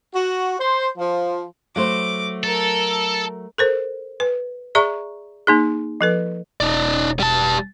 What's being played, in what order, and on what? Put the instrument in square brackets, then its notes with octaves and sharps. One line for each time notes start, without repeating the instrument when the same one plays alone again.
[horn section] F#4
C5
F3
[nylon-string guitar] F#3 A3 C5 [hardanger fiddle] D6
[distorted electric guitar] A4 [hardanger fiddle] A#4
[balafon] A4 A#4 C5
B4
G#4 D5 E5 A#5 C#6
A#3 D#4 G#4
F3 A4 B4
[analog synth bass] E1 [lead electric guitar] D#4 D5
[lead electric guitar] G3 A5